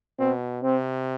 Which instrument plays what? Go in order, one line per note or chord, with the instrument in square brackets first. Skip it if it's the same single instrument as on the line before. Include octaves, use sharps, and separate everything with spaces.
[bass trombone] B2 [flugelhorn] C4
[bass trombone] C3 [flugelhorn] C4